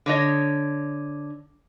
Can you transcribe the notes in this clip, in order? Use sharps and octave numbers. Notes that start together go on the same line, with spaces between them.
D3 C#5 D#5